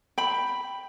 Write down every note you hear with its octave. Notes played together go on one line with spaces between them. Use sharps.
G5 B5